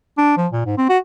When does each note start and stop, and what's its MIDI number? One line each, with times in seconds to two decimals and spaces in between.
0.18 0.35 62
0.37 0.47 53
0.53 0.64 46
0.66 0.78 44
0.78 0.86 60
0.89 0.98 66